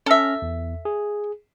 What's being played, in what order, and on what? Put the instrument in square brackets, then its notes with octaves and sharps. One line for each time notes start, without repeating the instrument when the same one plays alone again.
[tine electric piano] C#4 F6 A#6 [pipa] A4 E5
[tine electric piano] E2
G#4